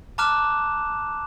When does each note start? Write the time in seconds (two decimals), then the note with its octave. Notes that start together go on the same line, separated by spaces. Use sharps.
0.18 A5 A#5 D6 F6 F#6 E7